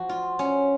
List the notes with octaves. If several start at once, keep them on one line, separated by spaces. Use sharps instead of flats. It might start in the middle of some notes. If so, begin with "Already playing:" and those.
Already playing: F3 F#4
F4
C#4